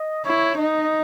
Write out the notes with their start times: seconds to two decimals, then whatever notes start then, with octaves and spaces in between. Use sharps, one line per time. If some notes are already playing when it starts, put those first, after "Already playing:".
Already playing: D#5
0.25 E4 C#5
0.58 D#4 D#5